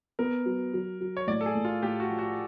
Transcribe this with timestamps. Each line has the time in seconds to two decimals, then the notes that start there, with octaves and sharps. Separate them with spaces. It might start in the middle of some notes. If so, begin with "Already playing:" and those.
0.19 B3 A#4
0.46 F#3
0.74 F#3
1.01 F#3
1.17 C#5
1.27 A2 D5
1.41 A4
1.46 G#4
1.55 A2
1.65 F4
1.82 A2 G4
2.00 F#4
2.09 F3
2.19 F#4